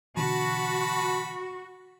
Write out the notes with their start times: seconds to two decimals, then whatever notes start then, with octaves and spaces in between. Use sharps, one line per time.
0.17 B2 D3 E3 F#4 A5 B5